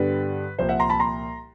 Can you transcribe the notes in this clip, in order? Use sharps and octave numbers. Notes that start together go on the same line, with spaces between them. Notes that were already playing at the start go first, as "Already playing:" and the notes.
Already playing: G2 D3 G3 B3 B4
C2 A#2 F3 C5
E5 F#5
A#5 C6
A5 B5
A#5 C6